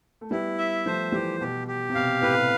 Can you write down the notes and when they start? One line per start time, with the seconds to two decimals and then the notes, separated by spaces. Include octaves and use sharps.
0.21 A3
0.31 G3 B3 E4
0.58 E5
0.86 F3 A3 C5
1.12 E3 G3 G4
1.40 B2 G4
1.68 G4
1.89 C3
1.95 B2 F5
2.22 A2 C3 B4